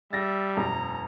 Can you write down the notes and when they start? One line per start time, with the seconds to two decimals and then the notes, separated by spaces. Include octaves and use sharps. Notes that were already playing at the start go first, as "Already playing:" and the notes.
0.13 G3 E5 A6 A#6
0.57 E1 F#2 A#5